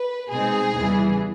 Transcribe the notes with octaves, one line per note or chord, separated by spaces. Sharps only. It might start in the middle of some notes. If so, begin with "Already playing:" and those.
Already playing: B4
B2 G#3 C4 D#4 G#4
E2 C#3 E3 G3 B3